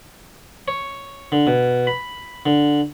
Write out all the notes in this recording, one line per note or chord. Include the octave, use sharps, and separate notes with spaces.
C#5
D3
B2
B5
D3